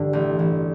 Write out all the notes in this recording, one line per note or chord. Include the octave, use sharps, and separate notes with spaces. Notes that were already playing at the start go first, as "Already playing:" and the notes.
Already playing: G2 D3
A1
A1